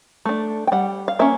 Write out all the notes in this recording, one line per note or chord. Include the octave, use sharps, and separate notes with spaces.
A3 D4
G5
G3 F#5
F5
A#3 C#4 E5